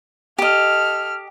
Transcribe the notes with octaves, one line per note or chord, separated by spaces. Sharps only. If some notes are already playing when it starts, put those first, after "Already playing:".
G4 A4 D#5 F6